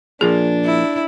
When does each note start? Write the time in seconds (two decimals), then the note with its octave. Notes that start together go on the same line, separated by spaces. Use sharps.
0.21 A#2 F3 A#3 D4 G#4
0.65 E4